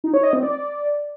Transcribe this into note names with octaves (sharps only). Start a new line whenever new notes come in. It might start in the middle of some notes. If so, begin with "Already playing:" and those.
D#4
C#5
D#5
C4
D5